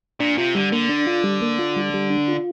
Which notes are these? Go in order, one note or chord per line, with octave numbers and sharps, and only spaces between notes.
A#2 D4
C3 F4
D3 G3
D3 A#3
D4
F4
G3
A#3
F4
G3
G3
D4
F4